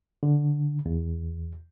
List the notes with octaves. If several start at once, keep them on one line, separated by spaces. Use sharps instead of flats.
D3
E2